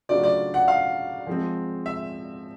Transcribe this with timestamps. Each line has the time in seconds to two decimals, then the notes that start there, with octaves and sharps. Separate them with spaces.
0.09 C#3 F#3 A3 D4 F4 D5
0.23 D5
0.54 F#5
0.68 F5
1.27 F3 G#3 C4
1.86 E5